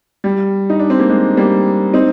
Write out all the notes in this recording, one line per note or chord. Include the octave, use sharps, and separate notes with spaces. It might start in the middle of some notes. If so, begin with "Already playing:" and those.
G3
D#4
D4
C4
A#3
G#3
G3 A#3
C4 D#4